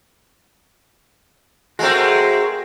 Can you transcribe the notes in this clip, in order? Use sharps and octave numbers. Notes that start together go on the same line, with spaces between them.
G#3 A3 C4 F#4 A#4